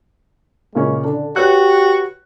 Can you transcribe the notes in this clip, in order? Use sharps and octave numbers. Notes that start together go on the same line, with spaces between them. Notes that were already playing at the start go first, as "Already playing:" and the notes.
A#2 C#3 G#3 C#4
D3 D4 A4
F#4 G4 B4 C#5 F#6